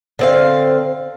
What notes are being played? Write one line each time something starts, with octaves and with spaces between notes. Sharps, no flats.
D3 C4 F5